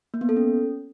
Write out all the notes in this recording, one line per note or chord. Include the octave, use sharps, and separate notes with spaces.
A#3
B3
A4
C#4